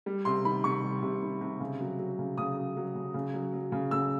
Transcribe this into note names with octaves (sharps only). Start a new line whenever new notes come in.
G3
C3 C6
D#3 B5
C3 C#6
G3
C3
D#3
C3
C#3
F#3
F#3
C#3
C#3 D#6
F#3
F#3
C#3
C#3
F#3
F#3
C#3
C#3 E6